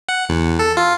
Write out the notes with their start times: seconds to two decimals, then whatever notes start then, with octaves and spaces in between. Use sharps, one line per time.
0.09 F#5
0.29 E2
0.59 A4
0.77 F4